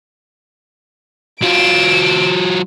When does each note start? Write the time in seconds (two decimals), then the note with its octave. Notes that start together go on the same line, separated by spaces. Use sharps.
1.42 F#3 F4 D7 E7